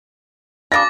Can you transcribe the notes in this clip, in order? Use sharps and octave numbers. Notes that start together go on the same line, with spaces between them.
C#3 D4 D6 A6 A#6